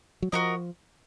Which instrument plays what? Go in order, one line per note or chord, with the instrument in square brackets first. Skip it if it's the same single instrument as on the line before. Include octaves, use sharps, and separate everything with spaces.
[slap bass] F#3
[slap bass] F3 [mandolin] F#4 A#4 D#5